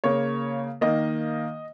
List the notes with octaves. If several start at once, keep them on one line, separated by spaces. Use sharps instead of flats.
C#3 A#3 C#5
D#3 A#3 D#5